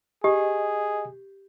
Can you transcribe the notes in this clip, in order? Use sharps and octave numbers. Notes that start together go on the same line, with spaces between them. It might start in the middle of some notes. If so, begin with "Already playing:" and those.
G4 G#4 D#5